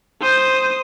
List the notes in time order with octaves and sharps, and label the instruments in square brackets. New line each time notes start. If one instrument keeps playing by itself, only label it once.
[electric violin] C5 D#6 [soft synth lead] G6